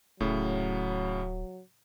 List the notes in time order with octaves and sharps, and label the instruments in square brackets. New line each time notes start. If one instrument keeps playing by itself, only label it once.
[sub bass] D1 [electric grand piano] A2 C#3 [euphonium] F#3